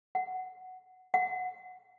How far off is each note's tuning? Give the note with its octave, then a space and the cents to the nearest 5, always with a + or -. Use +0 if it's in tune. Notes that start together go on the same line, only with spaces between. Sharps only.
F#5 +5
F#5 -10